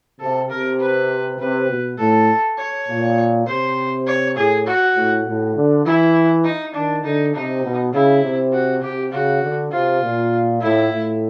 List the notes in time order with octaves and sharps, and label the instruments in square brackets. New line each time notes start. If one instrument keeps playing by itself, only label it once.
[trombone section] C3 [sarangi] A4
[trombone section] C3 [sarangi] A#4
[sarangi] B4
[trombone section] C3 [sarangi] B4
[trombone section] B2
[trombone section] A2 [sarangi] A4
[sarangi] C#5
[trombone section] A#2
[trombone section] C3 [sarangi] C5
[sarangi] C#5
[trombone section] A2 [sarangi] G#4
[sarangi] F#4
[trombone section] A2
A2
D3
[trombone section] E3 [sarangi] E4
[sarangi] D#4
[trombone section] D#3 [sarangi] D4
[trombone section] D3 [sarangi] D#4
[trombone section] C3 [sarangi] D#4
[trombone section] B2
[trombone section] C#3 [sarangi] E4
[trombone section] C3
[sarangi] F#4
[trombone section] C3 [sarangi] G4
[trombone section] C#3 [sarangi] F#4
[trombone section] D3
[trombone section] C3 [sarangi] F4
[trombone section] A#2
[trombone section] A2 [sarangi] E4
[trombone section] A2